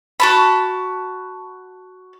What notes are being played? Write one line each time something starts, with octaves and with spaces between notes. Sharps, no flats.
F#4 A5 B5